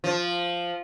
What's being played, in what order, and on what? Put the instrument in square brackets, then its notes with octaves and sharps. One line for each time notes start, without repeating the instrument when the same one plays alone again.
[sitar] F3